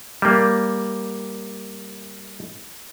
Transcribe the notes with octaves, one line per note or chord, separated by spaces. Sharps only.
G3 A#3